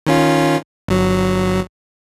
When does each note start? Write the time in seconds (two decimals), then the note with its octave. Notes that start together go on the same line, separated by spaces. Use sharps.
0.07 D#3 C#4 F4
0.88 G1 F#3